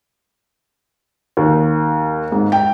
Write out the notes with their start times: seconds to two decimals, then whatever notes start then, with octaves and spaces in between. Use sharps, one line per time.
1.37 D#2
2.32 G#2
2.52 G5